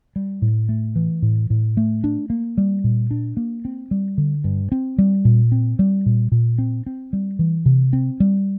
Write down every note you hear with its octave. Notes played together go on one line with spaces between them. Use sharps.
G3
A2
A3
E3
A2
A2
A3
D4
A#3
G3
A#2
D4
A#3
C4
G3
D3
G2
C4
G3
A#2
C4
G3
A#2
A#2
C4
C4
G3
E3
C3
C4
G3